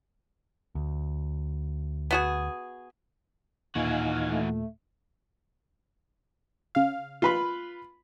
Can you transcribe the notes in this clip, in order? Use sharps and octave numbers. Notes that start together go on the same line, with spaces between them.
D2
B3 F#4 G#4
D#2 A#2 E3 D#4 F#4 F5 G#5
A3
C#3 F5
F4 B4 B5